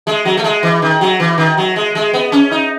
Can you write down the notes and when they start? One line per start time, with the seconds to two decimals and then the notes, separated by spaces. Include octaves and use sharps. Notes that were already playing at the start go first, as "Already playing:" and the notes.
0.07 G#3
0.25 F#3
0.37 A3
0.44 G#3
0.63 E3
0.82 D#3
1.01 F#3
1.20 E3
1.38 D#3
1.57 F#3
1.76 G#3
1.95 G#3
2.13 B3
2.32 C#4
2.51 D#4